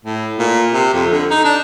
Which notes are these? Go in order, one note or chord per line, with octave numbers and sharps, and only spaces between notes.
A2
A#2
C3
F2
D3
D#4
D4